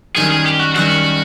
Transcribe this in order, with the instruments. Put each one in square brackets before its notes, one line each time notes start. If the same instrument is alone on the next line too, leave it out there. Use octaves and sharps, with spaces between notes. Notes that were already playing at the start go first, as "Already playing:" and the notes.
[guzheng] F#2 D#3 G3 [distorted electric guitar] G#4
[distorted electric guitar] G#4
G4
F#4
[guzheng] F#2 D#3 G3 [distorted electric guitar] F#4